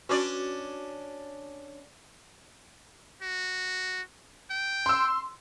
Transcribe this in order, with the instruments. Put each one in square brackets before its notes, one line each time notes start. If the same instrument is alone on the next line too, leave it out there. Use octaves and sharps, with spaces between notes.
[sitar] C#4 D4 D5 [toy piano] F#4 B4
[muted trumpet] F#4
G5
[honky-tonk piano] C6 E6